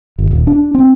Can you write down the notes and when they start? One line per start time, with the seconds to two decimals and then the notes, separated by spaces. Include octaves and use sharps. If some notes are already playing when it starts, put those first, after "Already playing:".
0.18 G1
0.31 D#1
0.47 D4
0.75 C4